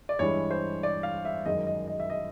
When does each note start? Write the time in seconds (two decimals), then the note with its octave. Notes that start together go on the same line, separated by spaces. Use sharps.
0.09 D5
0.19 G2 E3 G#3 C#5
0.51 C5
0.83 D5
1.03 F5
1.25 E5
1.45 F#2 D#3 G#3 D#5
1.67 D#5
1.87 D#5
2.00 E5
2.10 D#5